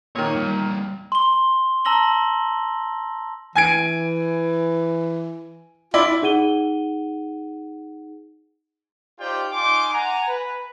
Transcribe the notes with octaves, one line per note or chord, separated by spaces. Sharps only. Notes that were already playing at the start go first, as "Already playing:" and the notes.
A#2 D#3 C#5
E2 G3
C6 G7
A5 A#5 E6 A#6 F#7 G7
E3 G#5 G#6 D7
E4 F4 D5
D#4 G#4 F#5 D#7 G7
D#4 F4 G4 C5 D5 G5
D#4 F4 G#5 C6 D6
F#5 G#5 A#5
B4